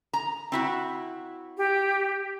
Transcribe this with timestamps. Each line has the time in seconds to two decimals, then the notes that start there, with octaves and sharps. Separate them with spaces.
0.13 A#5
0.52 C4 E4 F#4
1.58 G4